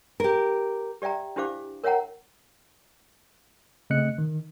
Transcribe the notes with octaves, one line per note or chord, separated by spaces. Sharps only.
G4 A#4
G4 D5 E5 G5 A#5
D4 E4 G4 C5 F5 D6
A#4 C#5 E5 F#5 G5 A#5
C#3 A3 C4 D#5 F#6 C#7
D#3